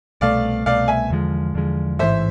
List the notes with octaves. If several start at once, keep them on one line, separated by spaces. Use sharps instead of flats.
C2 B2 A3 D5 F5
C2 B2 A3 D5 F5
E5 G#5
E2 D3 F3 G#3
E2 D3 F3 G#3
A1 G#2 E3 C5 E5